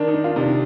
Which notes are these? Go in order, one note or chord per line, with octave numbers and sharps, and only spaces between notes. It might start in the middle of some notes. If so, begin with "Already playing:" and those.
Already playing: D#3 D4
D#4
D#3
F4
C3 D4 D#4